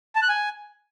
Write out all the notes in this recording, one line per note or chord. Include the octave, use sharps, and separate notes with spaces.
A5
F#6
G#5